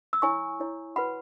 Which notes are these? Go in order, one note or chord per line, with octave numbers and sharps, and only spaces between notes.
E6
E4 C#5 G#5 C#6
E4 C#5
F#4 B4 F#5 B5